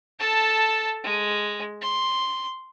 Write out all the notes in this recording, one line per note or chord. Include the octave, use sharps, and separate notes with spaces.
A4 A5
G#3
C6